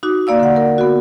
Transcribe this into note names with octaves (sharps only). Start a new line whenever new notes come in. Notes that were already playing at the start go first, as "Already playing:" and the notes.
D#4 F#4 D6
A#3 D5 F5 E6
D3 F#5
A#4
B3 F#4